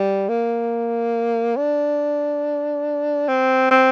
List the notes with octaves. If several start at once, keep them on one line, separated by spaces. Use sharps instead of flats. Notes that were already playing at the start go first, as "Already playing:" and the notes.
Already playing: G3
A#3
D4
C4
C4